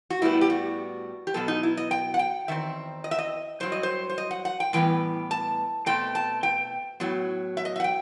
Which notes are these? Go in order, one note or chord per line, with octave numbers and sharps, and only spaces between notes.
F#4
A2 G3 B3 E4
G4
F#4
G4
B2 F#3 B3 A4
D#4
E4
D#5
G5
F#5
G5
E2 D#3 C4 E5
D#5
E5
D#5
G2 F#3 C4 C5
D#5
C5
C5
D#5
F#5
F#5
G5
A2 E3 G3 B3 G5
A5
B2 A3 C4 G5
A5
G5
A2 F#3 B3
E5
D#5
E5
F#5
G5